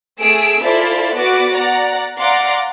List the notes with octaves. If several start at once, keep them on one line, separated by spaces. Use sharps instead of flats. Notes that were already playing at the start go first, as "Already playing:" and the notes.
A3 G#4 E6 D7
E4 F4 A4 C5 D5
B3 F#4 B4 D5 D6
D5 F#5 A#5
D5 F5 F#5 A#5 C6 D6